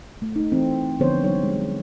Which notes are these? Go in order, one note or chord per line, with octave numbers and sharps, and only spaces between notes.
A3
A3 D#4
E3 C4
D3 F3 B3 C4 C5 C#5
F#3 G3 D#4 C#5
G#3